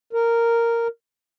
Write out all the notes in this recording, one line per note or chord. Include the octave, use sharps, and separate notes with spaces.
A#4